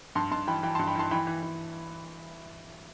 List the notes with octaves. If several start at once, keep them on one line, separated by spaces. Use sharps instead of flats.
G2 A5 C6
G2 A5 C6
E3 G5 B5
E3 G5 B5
A5 C6
G2
G5 B5
E3 A5 C6
E3 G5 B5
E3
E3